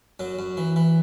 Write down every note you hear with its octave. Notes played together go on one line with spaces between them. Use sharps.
F#2 F#3
F#2
E3
E3